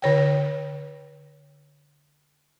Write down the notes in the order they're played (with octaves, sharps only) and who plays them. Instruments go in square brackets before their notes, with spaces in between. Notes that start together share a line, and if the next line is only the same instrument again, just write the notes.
[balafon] D3 C#5 G5